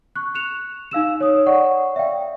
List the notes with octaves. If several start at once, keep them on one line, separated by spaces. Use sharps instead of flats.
C#6 F#6
F#6 C#7 E7 F7
D#4 F5 E6 E7
C#5 D#6
C#5 D5 F#5 C#6
E5 F5 G5